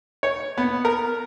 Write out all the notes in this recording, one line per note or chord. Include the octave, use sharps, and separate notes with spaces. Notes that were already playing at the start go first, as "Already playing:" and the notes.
C#5
B3
A#4